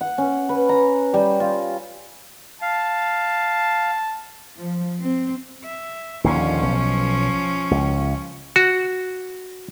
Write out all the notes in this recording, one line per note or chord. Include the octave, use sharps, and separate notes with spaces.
F#5
C#4
B4
A#5
G3
F4
F5 A5
F3
C4
E5
D#2 A#2 D3 F3 C#4
B1
C#2
F#4